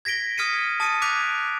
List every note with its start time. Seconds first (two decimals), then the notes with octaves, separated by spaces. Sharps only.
0.05 G#6 A#6 B6 D7 G7
0.38 D#6 F6 G#6 B6 C#7 D#7
0.80 A5 D#6 A6 C#7 D#7
1.02 D6 F#6 G#6 B6 D7 F7